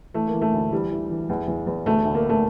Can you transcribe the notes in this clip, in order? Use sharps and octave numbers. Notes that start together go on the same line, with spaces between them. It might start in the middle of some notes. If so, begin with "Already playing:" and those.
E3 A3
A#3
E3
A3
D2
E3 G3
E3
E3
E2
E2
E2
D2 A3
D2
A#3
A3